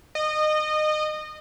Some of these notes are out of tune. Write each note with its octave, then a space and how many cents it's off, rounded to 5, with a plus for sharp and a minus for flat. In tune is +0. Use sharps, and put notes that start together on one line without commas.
D#5 -25